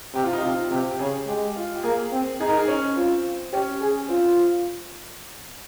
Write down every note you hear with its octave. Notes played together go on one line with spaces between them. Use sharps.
C3 G4
F4
D#4
C3 F4
C3 G4
G4
C#3 G#4
G#3 G4
F4
G4
A#3 G#4
C4
D#4 G#4
A#4
G#4
C#4
C4 F4
C#4 G4
G#4
C4 F4